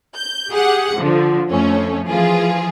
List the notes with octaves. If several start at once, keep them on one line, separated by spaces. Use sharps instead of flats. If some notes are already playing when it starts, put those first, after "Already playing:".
G6
G4 G#4 F#5
D3 F3
F2 F3 A3 C#4
E3 F3 F4 G#4